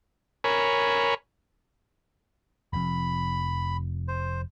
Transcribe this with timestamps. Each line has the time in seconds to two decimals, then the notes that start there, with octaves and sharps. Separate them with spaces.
0.44 A#4 C#5 G#5 B5
2.73 F1 F2 B5
4.08 C5